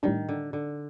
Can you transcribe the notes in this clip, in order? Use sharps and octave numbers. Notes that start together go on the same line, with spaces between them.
A2 D#3 G3 D4
D3
D3